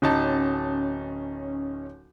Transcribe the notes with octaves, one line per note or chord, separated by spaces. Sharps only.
D1 C#4 D#4 A5